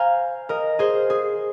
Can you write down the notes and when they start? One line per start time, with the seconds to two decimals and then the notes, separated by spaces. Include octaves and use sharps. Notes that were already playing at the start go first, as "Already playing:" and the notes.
Already playing: C5 F5 G#5 A#5
0.49 A#4 D#5
0.79 G#4 C5
1.10 G#4